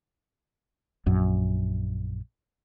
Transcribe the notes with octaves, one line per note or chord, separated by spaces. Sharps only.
A#1 F#2